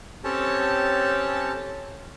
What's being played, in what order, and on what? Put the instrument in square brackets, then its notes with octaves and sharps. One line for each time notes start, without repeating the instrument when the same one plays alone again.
[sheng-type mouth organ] C4 C#4 G4 A4 C#5 A5